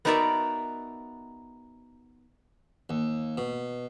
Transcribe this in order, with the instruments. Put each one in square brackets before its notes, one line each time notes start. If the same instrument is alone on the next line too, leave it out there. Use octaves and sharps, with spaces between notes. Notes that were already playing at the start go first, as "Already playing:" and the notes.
[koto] B3 D#4 F#4 A#4 D5 E5
[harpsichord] D#2
B2